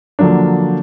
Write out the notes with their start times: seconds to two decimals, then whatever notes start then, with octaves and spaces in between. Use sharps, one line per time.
0.19 D3 F3 F#3 A#3 D4